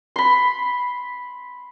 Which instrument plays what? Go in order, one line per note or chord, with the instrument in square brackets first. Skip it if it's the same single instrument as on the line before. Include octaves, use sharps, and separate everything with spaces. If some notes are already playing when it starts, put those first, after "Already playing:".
[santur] B5 C6